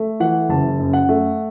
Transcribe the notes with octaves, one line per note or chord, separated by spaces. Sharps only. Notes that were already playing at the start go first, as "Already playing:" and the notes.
Already playing: A3
E3 F#5
F#1 A5
F#2
F#5
A3